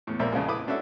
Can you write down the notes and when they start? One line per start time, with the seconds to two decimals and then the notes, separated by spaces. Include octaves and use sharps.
0.07 E2 A2
0.19 A#1 A#3 C4 D5 E5
0.32 F2 C#3 F3 G#3
0.48 E4 B4 B5 D6 D#6
0.67 C#4 D4 F#4 A4 E5